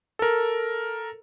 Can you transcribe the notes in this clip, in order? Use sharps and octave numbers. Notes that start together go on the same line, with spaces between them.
A4 A#4